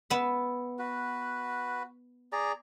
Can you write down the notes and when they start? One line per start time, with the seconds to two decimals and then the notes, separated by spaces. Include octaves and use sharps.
0.10 B3 E5
0.79 F#4 B4
2.32 G#4 D5 A#5